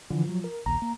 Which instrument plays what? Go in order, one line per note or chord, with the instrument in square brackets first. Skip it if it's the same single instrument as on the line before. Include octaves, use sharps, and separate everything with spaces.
[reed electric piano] D3 E3 [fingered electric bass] F3
[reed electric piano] F#3
A#4
[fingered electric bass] A#1 D#2 [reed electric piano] A#5
[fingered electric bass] A#3